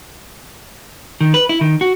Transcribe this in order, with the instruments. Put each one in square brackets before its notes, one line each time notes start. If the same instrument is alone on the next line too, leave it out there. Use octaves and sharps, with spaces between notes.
[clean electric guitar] D#3
B4
E4
D#3
F#4